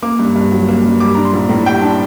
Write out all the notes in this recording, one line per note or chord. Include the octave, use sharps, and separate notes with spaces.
A#3 D6
G2
G2
F#3
A#3
G2
G3 D6
D4 A#5
C6
A#1
A2 A#5
G3 G5
D4 A5